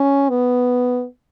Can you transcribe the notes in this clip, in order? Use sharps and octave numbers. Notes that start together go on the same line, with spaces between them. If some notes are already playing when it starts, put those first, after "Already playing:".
Already playing: C#4
B3